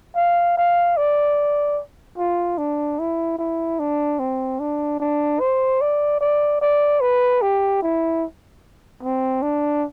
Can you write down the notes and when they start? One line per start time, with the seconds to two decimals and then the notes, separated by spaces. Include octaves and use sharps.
0.16 F5
0.57 F5
0.97 D5
2.18 F4
2.58 D4
2.99 E4
3.39 E4
3.80 D4
4.19 C4
4.60 D4
5.00 D4
5.40 C5
5.81 D5
6.20 D5
6.61 D5
7.01 B4
7.42 G4
7.82 E4
9.03 C4
9.43 D4